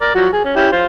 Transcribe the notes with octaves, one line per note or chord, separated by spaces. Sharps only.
A#4 D5
F3 F#3 F#4
G#4
C#4
C#4 E4 G4
F4 C5